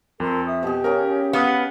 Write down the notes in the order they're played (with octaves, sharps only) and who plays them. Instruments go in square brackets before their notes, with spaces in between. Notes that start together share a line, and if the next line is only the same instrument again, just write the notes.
[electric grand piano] F2 [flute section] A4 A#4 C6
[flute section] E5 D#6
[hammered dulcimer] B2 G#4 [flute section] G4
[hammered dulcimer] C#3 C#4 G#4 [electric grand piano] A#4
[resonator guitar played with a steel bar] B3 [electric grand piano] F5 D#6 [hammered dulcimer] F#5